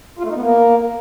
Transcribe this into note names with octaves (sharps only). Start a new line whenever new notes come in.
F4
A3
D#4
B3
A#3